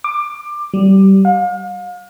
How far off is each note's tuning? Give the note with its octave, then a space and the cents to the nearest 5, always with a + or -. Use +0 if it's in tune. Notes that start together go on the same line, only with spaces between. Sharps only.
D6 +20
G3 -20
F5 +40